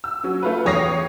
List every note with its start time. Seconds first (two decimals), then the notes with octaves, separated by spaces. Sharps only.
0.04 E6
0.24 F#3 C#4
0.42 A3 F4 B4
0.65 A1 E2 C#5 D#6 A#6 C7